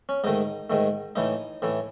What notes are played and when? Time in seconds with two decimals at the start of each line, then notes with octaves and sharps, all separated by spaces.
0.09 C#4
0.24 G#2 D#3 A3 D#4
0.70 G#2 D#3 A3
1.16 A2 E3 A3 D#4
1.62 A2 E3 A3